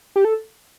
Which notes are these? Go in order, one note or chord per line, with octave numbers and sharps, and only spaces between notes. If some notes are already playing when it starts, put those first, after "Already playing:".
G4
A4